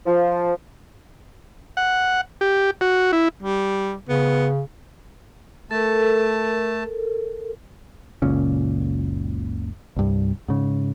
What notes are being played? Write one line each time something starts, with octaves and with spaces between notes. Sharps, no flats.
F3
F#5
G4
F#4
E4
G3
C#3 B3
A3 A4 A#4 A5
F#1 C#2 A#2 C#4
C2 G2
G#2 C#3